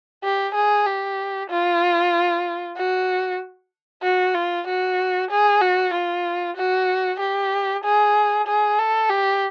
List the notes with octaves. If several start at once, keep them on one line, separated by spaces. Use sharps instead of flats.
G4
G#4
G4
F4
F#4
F#4
F4
F#4
G#4
F#4
F4
F#4
G4
G#4
G#4
A4
G4